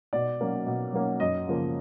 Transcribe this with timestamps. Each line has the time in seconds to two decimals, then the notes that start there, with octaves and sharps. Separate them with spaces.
0.13 B2 D5
0.41 F#3 A#3 C#4
0.66 B2
0.93 F#3 A#3 C#4
1.20 F#2 D#5
1.47 C#3 F3 A#3